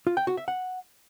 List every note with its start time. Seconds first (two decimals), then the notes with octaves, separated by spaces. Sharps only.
0.07 F4
0.17 G5
0.27 F#4
0.37 E5
0.48 F#5